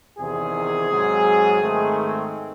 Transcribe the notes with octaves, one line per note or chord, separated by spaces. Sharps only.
E2 C3 D#3 G#4
G#2 F#3 C4
G#2 D#3 A3 C4